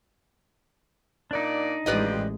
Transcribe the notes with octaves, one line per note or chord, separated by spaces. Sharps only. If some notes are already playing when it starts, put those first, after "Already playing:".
A#2 D4 D#4 D5
A1 F2 F3 G#3 G4 B4 D5 D#5